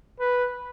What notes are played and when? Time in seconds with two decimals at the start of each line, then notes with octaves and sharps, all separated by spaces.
0.20 B4